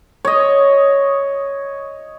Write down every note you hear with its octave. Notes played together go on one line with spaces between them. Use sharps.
C#5 D#5